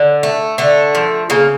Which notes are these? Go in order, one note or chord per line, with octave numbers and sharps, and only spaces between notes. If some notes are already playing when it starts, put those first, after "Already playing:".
Already playing: D3
A3
D3 A3
F3
C#3 A#3